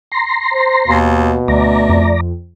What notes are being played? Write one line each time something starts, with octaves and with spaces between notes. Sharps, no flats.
A#5 C6
C5
D#2 B2
D2 A3 D5 A#5
F2